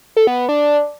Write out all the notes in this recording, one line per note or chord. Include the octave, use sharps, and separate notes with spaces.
A4
B3
B3
D4